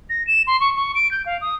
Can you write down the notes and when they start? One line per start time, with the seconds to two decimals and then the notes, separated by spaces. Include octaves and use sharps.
0.10 A#6
0.27 E7
0.47 C6
0.60 C#6
0.76 C#6
0.95 D7
1.11 G6
1.26 F5
1.41 D#6